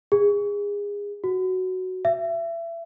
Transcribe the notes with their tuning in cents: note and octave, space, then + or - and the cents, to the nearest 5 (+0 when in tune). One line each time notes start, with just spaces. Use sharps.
G#4 -25
F#4 +5
E5 +30